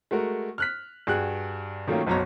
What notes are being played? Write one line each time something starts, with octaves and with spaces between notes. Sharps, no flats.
G#3 A3 F#4 A#4
F6 F#6 B6
G2 F#4 G#4 G5 F#6
D#3 F#3 A3 A#3 C#4 F4
F#1 B1 F#2 F#3 C#5 A#5